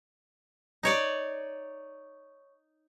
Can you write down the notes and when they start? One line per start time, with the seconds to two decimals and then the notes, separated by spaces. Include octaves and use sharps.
0.83 D#4 C#5 D5